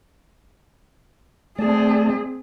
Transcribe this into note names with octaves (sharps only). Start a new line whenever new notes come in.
A3 C4 G#4 D5 A5